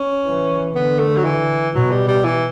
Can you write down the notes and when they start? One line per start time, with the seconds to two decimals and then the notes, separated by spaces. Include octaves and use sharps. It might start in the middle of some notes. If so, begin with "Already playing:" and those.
Already playing: C#4
0.25 E3
0.75 D3 B3
0.99 A3
1.17 F#3
1.24 E3
1.75 B2 F#3
1.91 G3
2.08 G3
2.24 E3